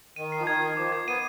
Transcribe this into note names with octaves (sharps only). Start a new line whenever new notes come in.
D#3 D#7
C7
F3
D#3 G#6
G#6
F3 D6
G#6
B3 D#7